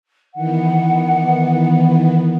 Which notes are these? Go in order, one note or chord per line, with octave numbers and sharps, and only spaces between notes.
D#3 E3 B3 F#5